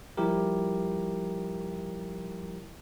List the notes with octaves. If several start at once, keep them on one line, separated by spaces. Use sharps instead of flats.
F3 G3 E4 G4 A#4